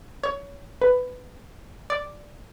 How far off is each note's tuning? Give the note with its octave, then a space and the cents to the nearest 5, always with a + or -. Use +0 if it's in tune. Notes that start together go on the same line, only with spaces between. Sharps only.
C#5 +25
B4 +15
D5 +0